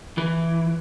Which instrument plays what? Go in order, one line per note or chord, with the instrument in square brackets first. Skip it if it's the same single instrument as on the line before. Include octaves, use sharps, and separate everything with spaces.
[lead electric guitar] E3